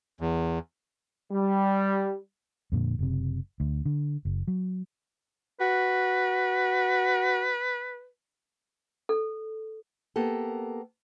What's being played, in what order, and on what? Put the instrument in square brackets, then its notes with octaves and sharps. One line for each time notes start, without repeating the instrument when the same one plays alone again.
[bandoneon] E2
[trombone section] G3
[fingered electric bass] F2 A#2 D3
F#1 C3
D2
D3
F#1
F#3
[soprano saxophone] F#4 [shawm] B4
[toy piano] A4
[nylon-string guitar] A#3 B3 G4 A4